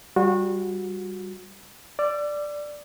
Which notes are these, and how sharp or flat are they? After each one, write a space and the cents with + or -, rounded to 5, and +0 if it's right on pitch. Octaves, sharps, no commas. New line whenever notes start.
G3 +0 F#4 -25
D5 +0 E6 +45